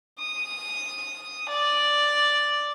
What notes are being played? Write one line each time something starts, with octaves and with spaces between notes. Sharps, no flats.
D#6
D5